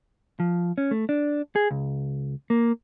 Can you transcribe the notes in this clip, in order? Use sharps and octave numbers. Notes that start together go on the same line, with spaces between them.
F3
C#4
A3
D4
G#4
C#2
A#3